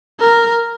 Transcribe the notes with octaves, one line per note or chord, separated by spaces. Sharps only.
A#4